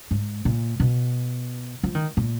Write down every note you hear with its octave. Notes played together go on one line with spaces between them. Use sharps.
G#2
A#2
B2
F3
D#3
A#2